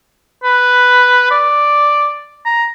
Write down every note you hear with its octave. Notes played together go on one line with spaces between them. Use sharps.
B4
D5
A#5